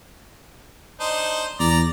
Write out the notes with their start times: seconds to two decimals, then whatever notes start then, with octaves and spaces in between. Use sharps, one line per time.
1.00 D4 D#4 C5
1.60 E2 D5 A#5